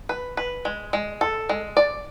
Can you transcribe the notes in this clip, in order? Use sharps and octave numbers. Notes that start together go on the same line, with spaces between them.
B4
B4
G#3
G#3
A4
G#3
D5